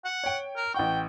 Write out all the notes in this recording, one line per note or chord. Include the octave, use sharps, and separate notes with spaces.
F#5
C#5 G5
A#4
A1 F#5 G5 C#6